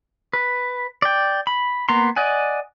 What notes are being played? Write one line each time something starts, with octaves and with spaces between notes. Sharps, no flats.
B4
D5 G5
B5
A#3 B3 A#5 C6
D5 D#5 F#5 G#5